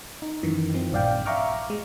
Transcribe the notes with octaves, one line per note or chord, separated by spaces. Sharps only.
D#4
F#2 D#3 E3
F3 C4
A#1 G2 D5 F5 G5
E5 F5 A#5 C#6 D6 F6
G#3